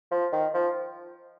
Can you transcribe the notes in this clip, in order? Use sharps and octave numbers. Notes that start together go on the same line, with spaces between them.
F3
D#3
F3